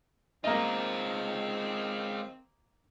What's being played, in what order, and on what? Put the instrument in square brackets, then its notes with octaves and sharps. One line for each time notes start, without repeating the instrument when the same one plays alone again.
[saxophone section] D#3 C4 [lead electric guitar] G#3 F4 [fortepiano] A#3 D#5